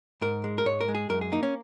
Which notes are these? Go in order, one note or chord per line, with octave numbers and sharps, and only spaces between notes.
G#2 A#4
G#3
A#4
G#2 C#5
A#4
G#3
G#4
F#2 A#4
G#4
A#3 D#4
C#4